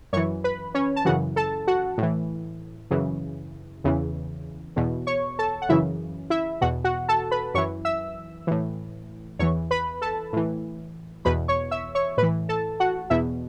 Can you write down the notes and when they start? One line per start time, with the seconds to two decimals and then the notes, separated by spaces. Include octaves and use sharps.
0.13 F#2 E3 C#5 C#6
0.44 B4 B5
0.74 C#4 C#5
0.96 A5
1.05 F#2 C#3 E3 F#4 F#5
1.36 A4 A5
1.67 F#4 F#5
1.98 A2 E3
2.91 F#2 C#3 E3
3.84 E2 C#3 E3
4.76 E2 B2
5.07 C#5 C#6
5.39 A4 A5
5.62 F#5
5.69 F#2 C#3 E3 E4 E5
6.30 E4 E5
6.61 E2 B2 F#4 F#5
6.84 F#4 F#5
7.08 A4 A5
7.31 B4 B5
7.54 F#2 E3 C#5 C#6
7.85 E5 E6
8.47 A2 E3
9.39 E2 E3 C#5 C#6
9.71 B4 B5
10.02 A4 A5
10.33 A2 E3
11.25 E2 B2 B4 B5
11.48 C#5 C#6
11.71 E5 E6
11.95 C#5 C#6
12.17 A2 B4 B5
12.23 E3
12.49 A4 A5
12.80 F#4 F#5
13.10 E2 B2 E4 E5